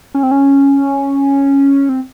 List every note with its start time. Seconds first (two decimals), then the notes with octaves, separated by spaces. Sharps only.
0.14 C#4
0.23 C4
0.31 C#4
1.89 C4